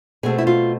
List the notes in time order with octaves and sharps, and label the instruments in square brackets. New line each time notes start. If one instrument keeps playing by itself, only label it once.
[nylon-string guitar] B2 A3 C4 G#4
E4
F4